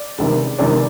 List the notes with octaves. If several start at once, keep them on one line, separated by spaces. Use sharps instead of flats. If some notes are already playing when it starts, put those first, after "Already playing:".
Already playing: D5
C#2 C3 D#3
C#2 C3 D#3 D5